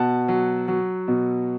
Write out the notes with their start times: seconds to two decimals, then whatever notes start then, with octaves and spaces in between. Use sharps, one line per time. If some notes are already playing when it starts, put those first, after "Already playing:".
Already playing: B2 F#5 A5
0.28 F#3
0.68 F#3
1.08 B2